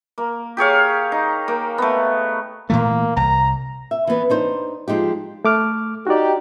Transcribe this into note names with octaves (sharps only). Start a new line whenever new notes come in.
A#3
G4 G#4 C#5 F5
D#4
A#3
A3 B3
A#2 E3 A3 A#3
C2 A#5
E5
E3 B3
D4 D#4 C5
F3 G#3 D#4 G4
A3 D6 F6
D#4 F#4 G4 D5